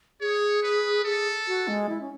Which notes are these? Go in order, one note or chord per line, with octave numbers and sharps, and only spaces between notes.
G#4 C#5
B4
G#4 A4
F#4
G#3
E4
C#4